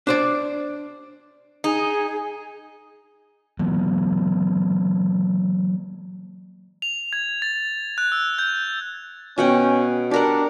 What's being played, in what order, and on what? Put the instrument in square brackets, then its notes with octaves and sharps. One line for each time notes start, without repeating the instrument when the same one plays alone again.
[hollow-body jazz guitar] D4 C5 D5
[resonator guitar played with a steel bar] D#4 [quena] G#4
[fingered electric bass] E3 F#3 A#3 B3
[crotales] F7
G#6
A6
F#6
E6
G6
[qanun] B2 F#5 G5 [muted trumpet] C#4
[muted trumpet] D4 [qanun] G4 A#4 F#5